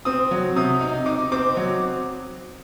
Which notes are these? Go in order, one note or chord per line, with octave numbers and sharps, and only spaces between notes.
C4 D#6
F#3
C3 D#6
D#4
D#4 D6
C4 D6
F#3